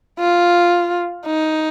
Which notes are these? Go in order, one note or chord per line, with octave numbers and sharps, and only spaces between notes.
F4
D#4